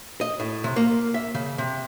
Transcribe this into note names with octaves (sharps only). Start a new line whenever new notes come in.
D#5
A2
C3
A#3
E5
C#3
C3